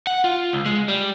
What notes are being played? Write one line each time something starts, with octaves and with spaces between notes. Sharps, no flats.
F#5
F4
C#2
G#3
G3